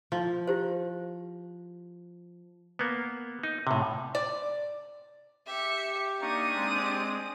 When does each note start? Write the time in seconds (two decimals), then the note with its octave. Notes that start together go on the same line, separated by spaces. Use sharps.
0.12 F3
0.48 E4 G4 C5
2.79 A#3 B3
3.43 D#4
3.67 A2 C3
4.15 D5
5.47 G4 E5 C#7
6.21 A#3 D4 D#4 C#6 D#6
6.54 G#3 C4